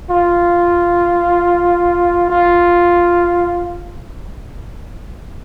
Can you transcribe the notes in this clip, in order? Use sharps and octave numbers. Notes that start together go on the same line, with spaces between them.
F4
F4